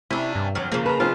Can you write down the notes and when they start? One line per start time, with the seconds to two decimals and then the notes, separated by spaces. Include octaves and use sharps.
0.11 C3 C#4 D4 E4
0.35 G2
0.55 G1 F2 F#3 F6
0.72 C#3 F3 G#3 A#3
0.86 B4 A5 A#5
1.00 B1 C4 F4 A5